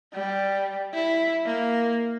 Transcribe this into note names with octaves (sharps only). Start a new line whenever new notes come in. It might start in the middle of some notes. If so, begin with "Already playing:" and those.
G3
E4
A#3